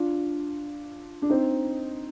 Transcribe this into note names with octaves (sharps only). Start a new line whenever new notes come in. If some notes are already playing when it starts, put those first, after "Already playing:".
Already playing: D4 F4
D4
C4 D#4